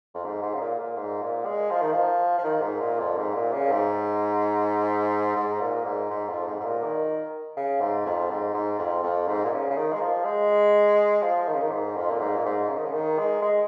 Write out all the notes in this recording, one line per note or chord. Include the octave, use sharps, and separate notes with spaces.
F2
G#2
G#2
C#3
A#2
A#2
G#2
A#2
G#3
F3
D#3
F3
F3
D#3
G#2
A#2
F2
G#2
A#2
C#3
G#2
G#2
A#2
G#2
G#2
F2
G#2
G#2
A#2
D#3
C#3
G#2
F2
G#2
G#2
F2
F2
G#2
A#2
C#3
C#3
D#3
G#3
F3
G#3
F3
D#3
C#3
D#3
G#2
F2
A#2
G#2
A#2
G#2
C#3
D#3
C#3
D#3
G#3
G#3